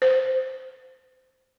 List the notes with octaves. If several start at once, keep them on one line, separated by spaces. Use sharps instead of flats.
C5